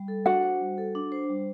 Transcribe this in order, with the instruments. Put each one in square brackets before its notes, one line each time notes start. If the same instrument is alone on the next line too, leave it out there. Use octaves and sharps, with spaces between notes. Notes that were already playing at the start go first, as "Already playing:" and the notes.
Already playing: [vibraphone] G3
A4
[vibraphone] D4 [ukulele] F#4 F#5
[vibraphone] C5
G3
A4
D4
C5
G3